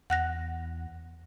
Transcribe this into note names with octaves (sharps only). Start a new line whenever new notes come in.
E2 F#5 F#6 A#6